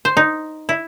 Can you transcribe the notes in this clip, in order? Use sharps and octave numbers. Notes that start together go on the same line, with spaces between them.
C5
D#4
E4